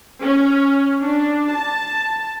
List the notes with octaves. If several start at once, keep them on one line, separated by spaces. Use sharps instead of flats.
C#4
D4
A5